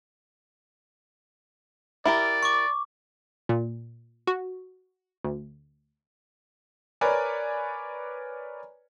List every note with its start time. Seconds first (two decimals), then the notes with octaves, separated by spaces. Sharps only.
2.05 E4 G4 A#4 D5
2.43 C#6 D6
3.49 A#2
4.27 F#4
5.24 D2
7.01 A#4 B4 C#5 D5 G#5